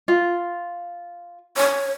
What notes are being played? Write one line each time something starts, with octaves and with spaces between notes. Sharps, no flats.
F4
C#5